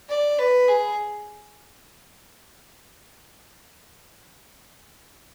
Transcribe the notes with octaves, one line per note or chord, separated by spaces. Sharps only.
D5
B4
G#4